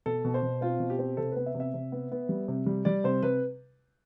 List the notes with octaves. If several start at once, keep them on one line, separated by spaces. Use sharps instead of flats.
B2 A4
B2
C5
B2
C4 F4
B2
G4
C4
C3 A4
B3 B4
E5
C3
E5
C3
B3
B3
G3
C3
G3
G3 D5
C3 C5
C3 B4